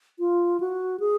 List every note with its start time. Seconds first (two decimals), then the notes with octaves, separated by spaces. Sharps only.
0.19 F4
0.60 F#4
1.00 G#4